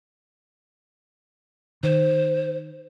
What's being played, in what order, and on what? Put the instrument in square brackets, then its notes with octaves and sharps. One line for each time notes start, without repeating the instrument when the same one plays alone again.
[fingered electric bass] D#3 [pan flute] C5